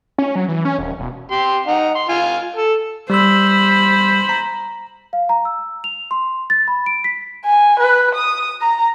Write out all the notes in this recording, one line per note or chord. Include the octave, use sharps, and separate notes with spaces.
C#4
F#3
E3
C#4
D#1
E1
G4 C6
D#4 F#5
C6
F4 F5 G#5
A4
G3 C5 B5 E6
A#5
F5
A#5
E6
F7
C6
A6
B5
D7
B6
G#5
B4
D#6
A#5